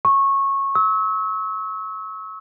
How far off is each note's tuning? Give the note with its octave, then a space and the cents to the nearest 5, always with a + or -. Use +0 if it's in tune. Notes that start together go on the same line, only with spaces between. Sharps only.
C#6 -15
E6 -35